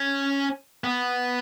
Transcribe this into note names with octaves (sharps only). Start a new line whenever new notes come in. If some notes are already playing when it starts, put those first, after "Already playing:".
Already playing: C#4
B3